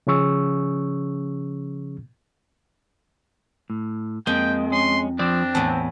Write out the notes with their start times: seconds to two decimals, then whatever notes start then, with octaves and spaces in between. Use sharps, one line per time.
0.07 C#3 F3 C#4 G#4 C#6 E6
3.70 A2
4.27 F2 G#3 A#3 G5
4.72 C#4 C6
5.19 F3 C4 D4 D5
5.55 E2 A2 A5